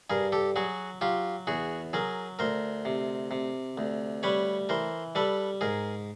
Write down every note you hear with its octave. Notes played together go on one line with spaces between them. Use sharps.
G2 G#4 A#4
G4 A4
F#3 F#4 G#4
F#3 F4 G4
E2 F#4 G#4
F#3 G#4 A#4
D2 A#4 C5
C3
C3
D2
G3 B4 C#5
E3 A#4 C5
G3 A4 B4
G#2 G#4 A#4